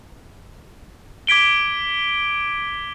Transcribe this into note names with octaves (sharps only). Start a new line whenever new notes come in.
D6 G#6 B6 D7 G7